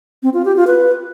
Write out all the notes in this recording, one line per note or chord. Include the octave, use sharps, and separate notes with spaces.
C4
F4
G4
F4
B4